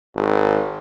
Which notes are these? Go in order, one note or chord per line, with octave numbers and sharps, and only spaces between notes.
G#1